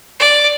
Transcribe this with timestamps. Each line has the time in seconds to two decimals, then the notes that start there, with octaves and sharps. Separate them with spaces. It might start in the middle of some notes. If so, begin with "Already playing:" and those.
0.19 D5